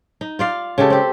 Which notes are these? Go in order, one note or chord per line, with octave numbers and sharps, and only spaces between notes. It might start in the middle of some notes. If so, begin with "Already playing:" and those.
D#4
F4 D5 F5
C#3 G#3 G4 A4
C4 G4